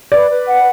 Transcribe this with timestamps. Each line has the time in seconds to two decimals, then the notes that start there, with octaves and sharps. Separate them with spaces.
0.12 B4 D5
0.30 B4
0.48 F#5